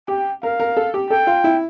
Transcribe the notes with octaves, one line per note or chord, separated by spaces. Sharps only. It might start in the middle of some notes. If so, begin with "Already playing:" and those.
G4 G5
A#4 F5
A#4
A4
G4
A4 G5
F4
E4